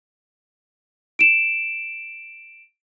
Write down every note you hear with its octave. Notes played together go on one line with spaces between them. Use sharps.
D7 E7